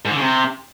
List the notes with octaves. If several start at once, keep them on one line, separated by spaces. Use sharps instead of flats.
G#2
D3
C#3
C3